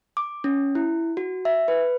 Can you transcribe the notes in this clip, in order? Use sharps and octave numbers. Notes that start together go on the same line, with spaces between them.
D6
C#4
E4
F#4
E5
B4